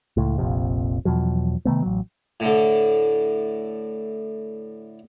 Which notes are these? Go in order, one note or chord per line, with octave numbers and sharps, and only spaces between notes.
C#2 A2
F1 A#1 F2 C3
E2 B2 F3 F#3
C3 D#3 A3 B3
A1 F#3
A2 D3